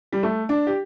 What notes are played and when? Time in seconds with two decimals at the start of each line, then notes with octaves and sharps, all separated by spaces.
0.12 G3
0.23 A3
0.49 D4
0.67 G4